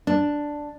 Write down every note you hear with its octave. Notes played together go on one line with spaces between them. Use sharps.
D4